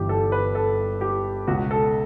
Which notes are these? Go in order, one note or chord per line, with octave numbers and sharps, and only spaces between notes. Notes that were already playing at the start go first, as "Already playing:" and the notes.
Already playing: G1 G2 E3 G4
A4
B4
A4
G4
C#2 B2 F#4
A4